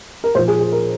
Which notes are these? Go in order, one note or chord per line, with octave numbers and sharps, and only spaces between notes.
A#4
A#2 F3 C5
G#4
G#4
A#4